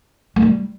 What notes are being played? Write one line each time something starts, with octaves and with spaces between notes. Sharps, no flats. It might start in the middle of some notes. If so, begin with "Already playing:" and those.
G#3
G3